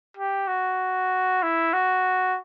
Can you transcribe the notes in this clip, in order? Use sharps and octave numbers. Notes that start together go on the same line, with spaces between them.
G4
F#4
E4
F#4